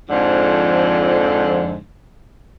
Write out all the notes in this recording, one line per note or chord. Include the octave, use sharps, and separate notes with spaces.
F2 G#2 D3 F3